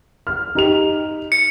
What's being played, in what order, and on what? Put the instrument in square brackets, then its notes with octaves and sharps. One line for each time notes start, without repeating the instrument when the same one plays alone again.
[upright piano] F6
D#4 G4 F7
[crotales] C#7